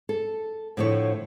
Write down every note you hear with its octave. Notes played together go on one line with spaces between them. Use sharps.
A4
A2 D3 F3 E4 C#5